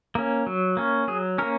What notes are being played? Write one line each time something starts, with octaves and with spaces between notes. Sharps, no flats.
A#3 C#4
F#3
A#3 C#4
F#3 G#4
A#3 C#4 A#4